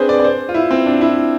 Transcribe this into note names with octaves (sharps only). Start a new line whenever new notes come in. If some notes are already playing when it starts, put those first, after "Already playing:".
Already playing: C4 D4 G#4 B4 C5
D5
D5
C5
F4
E4
C4
D4
E4